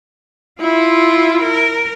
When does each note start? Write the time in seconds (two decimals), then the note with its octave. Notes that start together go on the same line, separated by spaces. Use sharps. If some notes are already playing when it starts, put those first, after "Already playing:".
0.61 E4 F4
1.42 A#4